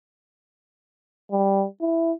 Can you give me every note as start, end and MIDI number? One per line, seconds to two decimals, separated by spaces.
1.32 1.65 55
1.81 2.12 64